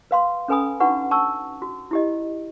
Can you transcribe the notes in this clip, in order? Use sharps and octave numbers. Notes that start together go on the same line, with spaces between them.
B4 F5 C6
C#4 A4 B4 G#5 B5 D#6
D4 D#4 F#4 B4 F#5 C#6
A5 C#6 E6
F#4
E4 G4 D#5